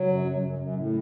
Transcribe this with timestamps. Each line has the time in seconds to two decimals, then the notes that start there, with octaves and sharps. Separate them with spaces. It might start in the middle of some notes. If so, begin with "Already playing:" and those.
Already playing: C#3 F#3
0.08 F#2
0.25 F#2
0.42 F#2
0.59 F#2
0.75 A2